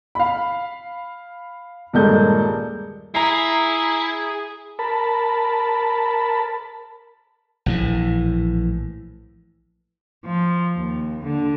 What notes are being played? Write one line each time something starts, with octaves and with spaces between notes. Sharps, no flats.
F5 B5
D#1 G2 G#3 A#3 A4 G6
E4 G#4 A#5 C7
A#4 A5 B5
A#1 A2 E3
F3
D#2
D3